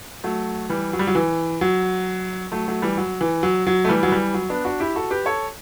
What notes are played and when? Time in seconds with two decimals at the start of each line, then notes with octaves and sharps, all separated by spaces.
0.24 F#3 A3
0.69 E3 G3
0.93 F#3
0.99 G3
1.07 F#3
1.15 E3
1.61 F#3
2.52 F#3 A3
2.68 F#3 A3
2.82 E3 G3
2.97 F#3
3.21 E3
3.43 F#3
3.67 F#3
3.85 A3
3.89 E3 G3
4.03 F#3
4.12 E3 G3
4.34 F#3
4.50 B3 D4
4.65 D4 F#4
4.80 E4 G4
4.95 F#4 A4
5.11 G4 B4
5.26 A4 C#5